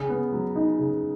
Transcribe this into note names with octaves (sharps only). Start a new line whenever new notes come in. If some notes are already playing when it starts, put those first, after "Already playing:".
Already playing: C#3
B3
F#3
D#4
C#3